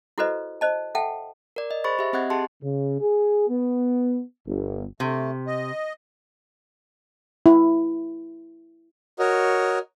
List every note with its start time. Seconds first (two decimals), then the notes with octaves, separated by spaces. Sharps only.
0.18 E4 F#4 A4 B4 C5 D#5
0.61 C5 D#5 A5
0.95 A4 E5 F#5 G5 A5
1.56 A#4 D5
1.71 D#5
1.84 G#4 C5 B5 C#6 A6
1.99 G4 E5
2.13 C4 D#5 F#5 F#6 G#6
2.30 G4 G#4 A5 C6
2.62 C#3
3.01 G#4
3.48 B3
4.46 G1
5.00 C3 A3
5.47 D#5
7.46 E4
9.19 F#4 A#4 C#5 D#5